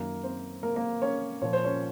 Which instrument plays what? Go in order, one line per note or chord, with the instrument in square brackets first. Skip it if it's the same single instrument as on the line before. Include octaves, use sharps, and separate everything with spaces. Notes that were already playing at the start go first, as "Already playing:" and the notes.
Already playing: [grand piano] F#2 D#3 F#3 A#3 A#4
C4 C5
A#3 A#4
A#3 A#4
C#4 C#5
A#2 F3 C#5
C5
C#4 C#5